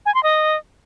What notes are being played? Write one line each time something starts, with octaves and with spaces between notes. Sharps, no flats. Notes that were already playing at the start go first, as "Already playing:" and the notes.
G#5
C6
D#5